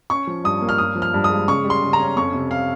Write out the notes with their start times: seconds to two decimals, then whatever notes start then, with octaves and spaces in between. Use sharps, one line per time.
0.10 C#4 C#6
0.27 F3
0.44 G2 D#6
0.62 A#3
0.69 F6
0.78 G2 D#6
0.95 F3
1.02 F6
1.14 G2
1.24 D#6
1.30 G#3
1.48 C#3 C#6
1.65 G3
1.70 C6
1.82 C#3
1.93 A#5
2.00 C#4
2.16 F2 C#6
2.33 C3
2.51 F5